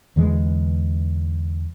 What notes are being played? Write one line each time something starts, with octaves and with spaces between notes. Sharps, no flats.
E2 D3 E3 G#3